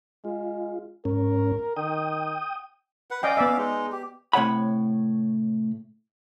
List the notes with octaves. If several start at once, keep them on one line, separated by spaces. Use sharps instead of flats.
G#3 F4
G#2 C#4 A#4
D#3 G5 D#6
B4 F#5
C#4 D5 D#5 F5 G5
B3 D5 E5
G#3 D#4
G4
A2 C3 C#5 F#5 B5